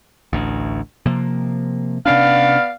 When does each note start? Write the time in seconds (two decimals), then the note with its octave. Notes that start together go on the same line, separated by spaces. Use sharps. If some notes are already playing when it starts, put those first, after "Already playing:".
0.33 A1 D2
1.06 C3 F3 A#3
2.06 C3 B3 C#4 D4 D5 F5